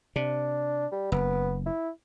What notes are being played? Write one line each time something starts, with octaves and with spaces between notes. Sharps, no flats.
C3 D4
G3
F#1 B3
E4